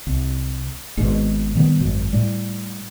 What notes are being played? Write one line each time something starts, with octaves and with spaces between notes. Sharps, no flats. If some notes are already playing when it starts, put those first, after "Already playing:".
C2
G#1 G#2 B2
B2 D#3 G3 B3
G#1 F#2
A2 G3